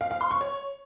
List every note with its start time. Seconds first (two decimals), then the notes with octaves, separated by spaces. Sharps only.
0.01 F5
0.11 F5
0.21 C6
0.31 C#6
0.41 C#5